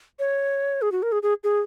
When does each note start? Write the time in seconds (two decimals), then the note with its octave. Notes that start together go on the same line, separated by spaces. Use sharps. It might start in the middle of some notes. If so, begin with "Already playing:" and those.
0.19 C#5
0.82 G#4
0.92 F#4
1.03 A#4
1.12 G#4
1.23 G#4
1.44 G#4